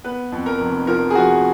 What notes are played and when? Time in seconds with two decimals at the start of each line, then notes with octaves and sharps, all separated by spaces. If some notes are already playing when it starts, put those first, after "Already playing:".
0.04 B3 B4
0.32 F2
0.46 A#4
0.60 F1
0.87 F3 A#4
1.10 G#4
1.15 F3 F#4